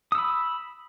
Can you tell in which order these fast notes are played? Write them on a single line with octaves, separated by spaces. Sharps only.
D#6 E6 B5